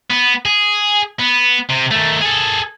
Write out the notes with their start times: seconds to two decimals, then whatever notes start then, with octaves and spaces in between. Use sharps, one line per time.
0.10 B3
0.46 G#4
1.19 B3
1.69 C3
1.91 D#3 A3
2.21 G#4 A4